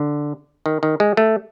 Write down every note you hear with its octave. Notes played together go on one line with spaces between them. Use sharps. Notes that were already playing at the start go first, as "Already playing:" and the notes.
Already playing: D3
D#3
D#3
G#3
A3